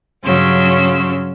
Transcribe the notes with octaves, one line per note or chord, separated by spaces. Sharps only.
G2 C#3 F#3 C#4 C6 E6